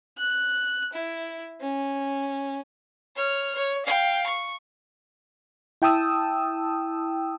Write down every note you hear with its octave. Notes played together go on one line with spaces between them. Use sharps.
F#6
E4
C#4
C#5 F6
C#5
F5 G5
C#6
E4 G5 A5 D#6 E6